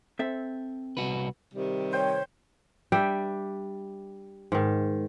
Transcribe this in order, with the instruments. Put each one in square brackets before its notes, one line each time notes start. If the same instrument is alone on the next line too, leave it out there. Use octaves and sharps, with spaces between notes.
[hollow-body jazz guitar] C4 A4 E5
[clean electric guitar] C2 F#4 B4
[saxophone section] C3 D#3 G3
[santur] C5 G5 [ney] C#5
[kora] G3 D4 E5 G5
G#2 D#3